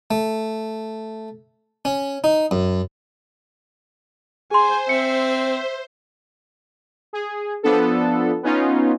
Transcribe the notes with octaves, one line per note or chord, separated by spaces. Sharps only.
A3
C#4
D#4
F#2
G#4 C5 G#5 C6
C4 E5 C#7
G#4
F3 B3 D4 A4
B3 C#4 D#4 F4